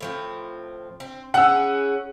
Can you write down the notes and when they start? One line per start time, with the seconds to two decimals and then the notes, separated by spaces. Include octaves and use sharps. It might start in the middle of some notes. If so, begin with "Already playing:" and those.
0.01 A2 F3 C4
1.00 C4
1.34 C#4 E4 G#4 F#5 E6